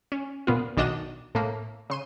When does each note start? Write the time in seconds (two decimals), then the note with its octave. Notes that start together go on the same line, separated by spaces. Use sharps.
0.12 C#4
0.47 A#2 B3 F4
0.77 B1 D#3 D4 F#4 D#5 E7
1.35 A2 A3 A#3
1.90 C#3 C6 D#7